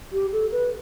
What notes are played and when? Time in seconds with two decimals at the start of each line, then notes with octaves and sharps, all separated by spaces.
0.12 G4
0.32 A4
0.52 B4